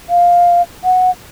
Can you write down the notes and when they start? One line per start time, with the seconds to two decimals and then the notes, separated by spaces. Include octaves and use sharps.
0.10 F5
0.84 F#5